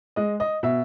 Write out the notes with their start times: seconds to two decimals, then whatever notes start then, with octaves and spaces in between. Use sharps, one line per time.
0.16 G#3 D#5
0.40 D#5
0.63 B2 E5